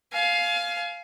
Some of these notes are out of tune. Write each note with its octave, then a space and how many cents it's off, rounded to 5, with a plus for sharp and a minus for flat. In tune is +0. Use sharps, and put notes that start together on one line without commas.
F5 +0 G#5 +30